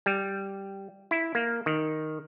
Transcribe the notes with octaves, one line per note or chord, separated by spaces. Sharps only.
G3
E4
A#3
D#3